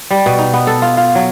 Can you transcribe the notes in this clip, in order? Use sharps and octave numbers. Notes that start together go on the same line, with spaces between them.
G3
B2
D#4
B3
A4
F4
F4
F#3